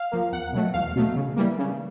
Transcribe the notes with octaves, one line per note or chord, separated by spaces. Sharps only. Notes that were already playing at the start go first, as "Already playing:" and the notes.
Already playing: F5
F3 A#3
E2 F#5
B2 F#3 A3
E2 F5
B2 F#3 A3
C#3
E3 G3 A#3
C#3